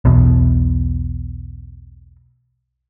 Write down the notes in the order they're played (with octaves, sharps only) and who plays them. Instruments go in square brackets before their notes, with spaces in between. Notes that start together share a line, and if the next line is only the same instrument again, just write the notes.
[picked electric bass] B1 E2 B2